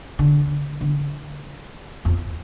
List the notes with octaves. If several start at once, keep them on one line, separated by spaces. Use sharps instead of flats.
D3
D3
F2